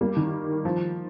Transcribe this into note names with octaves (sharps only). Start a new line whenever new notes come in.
G3 A#3
D#3
F3